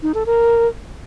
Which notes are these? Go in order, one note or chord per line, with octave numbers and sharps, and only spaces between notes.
D#4
A4
A#4